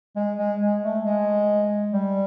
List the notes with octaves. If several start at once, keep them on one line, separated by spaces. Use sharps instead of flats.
G#3
G#3
G#3
A3
G#3
G3